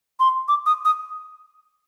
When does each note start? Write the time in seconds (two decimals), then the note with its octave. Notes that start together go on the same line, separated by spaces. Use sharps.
0.20 C6
0.48 D6
0.66 D#6
0.85 D#6